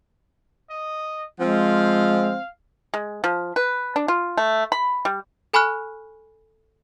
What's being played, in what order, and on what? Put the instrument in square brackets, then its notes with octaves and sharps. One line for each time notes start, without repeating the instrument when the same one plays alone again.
[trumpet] D#5
[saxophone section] F3 C4 [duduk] G#3 [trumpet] F5
[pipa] G#3
F3
B4
D4
F4
A3
B5
G3
[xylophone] A4 G#5 B5 C#6 F6 F#6